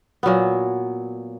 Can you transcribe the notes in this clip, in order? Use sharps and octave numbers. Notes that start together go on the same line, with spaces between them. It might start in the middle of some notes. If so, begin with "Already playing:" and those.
A#2 F#3 B3